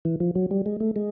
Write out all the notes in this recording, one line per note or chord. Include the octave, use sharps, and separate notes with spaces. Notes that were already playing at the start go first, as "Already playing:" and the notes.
E3
F3
F#3
G3
G#3
A3
G#3